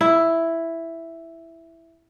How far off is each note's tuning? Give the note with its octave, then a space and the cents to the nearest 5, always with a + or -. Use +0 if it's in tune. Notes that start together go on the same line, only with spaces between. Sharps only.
E4 +5